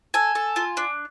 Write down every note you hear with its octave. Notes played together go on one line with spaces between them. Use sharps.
A4 G#5
A4
F4
D4